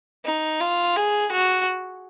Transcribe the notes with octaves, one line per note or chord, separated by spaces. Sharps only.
D#4
F4
G#4
F#4